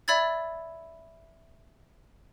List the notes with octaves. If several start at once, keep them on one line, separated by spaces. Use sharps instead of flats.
D5 E5 B5 E6 G#6 A6